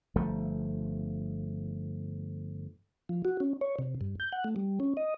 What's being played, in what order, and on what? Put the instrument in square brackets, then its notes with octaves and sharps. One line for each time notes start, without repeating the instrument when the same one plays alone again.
[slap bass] G1 F3 A3
[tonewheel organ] F3
F#4
C#4
C#5
C3
G2
G6
F#5
A3
G3
C#4
D#5